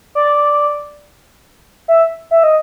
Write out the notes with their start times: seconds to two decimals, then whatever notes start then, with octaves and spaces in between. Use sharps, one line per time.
0.15 D5
1.88 E5
2.31 E5
2.43 D#5